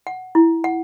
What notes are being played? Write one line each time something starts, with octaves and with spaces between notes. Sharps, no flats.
F#5
E4
F#5